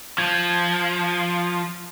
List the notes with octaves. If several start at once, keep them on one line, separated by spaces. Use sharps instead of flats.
F3 G#6